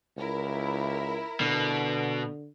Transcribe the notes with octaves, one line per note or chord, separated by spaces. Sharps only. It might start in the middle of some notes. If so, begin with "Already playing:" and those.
C#2 E4 A#4
B2 D3